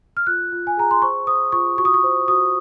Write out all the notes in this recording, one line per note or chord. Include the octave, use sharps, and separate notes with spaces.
F6
F4 F#6
F4
G#5
G#4 A#5
C6
C5 C#6
C5 D#6
F4 C#6
F#4 C#6
D#6
C#6
C5
F#4 D#6